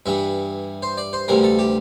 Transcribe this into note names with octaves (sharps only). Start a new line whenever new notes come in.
G2 E3 G3 E5
C5
D5
C5
D2 C3 E3 G3 A#4
A4
G4